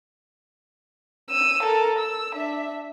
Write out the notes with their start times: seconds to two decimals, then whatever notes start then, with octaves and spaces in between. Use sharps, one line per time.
1.30 E6 D#7
1.63 A4 A#4
1.98 E6
2.34 D4 E5